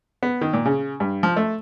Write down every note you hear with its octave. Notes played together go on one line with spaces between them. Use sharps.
B3
D#3
A#2
C#3
G2
F3
A3